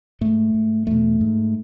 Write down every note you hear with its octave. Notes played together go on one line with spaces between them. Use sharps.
G#2 A3
G#2
E2 B2 A3
G#2